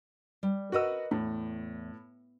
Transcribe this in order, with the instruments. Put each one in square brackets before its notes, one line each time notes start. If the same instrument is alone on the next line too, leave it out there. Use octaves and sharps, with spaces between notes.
[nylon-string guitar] G3
[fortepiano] F#4 E6 [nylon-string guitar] A#4 B4 D#5
[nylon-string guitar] E2 [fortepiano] A2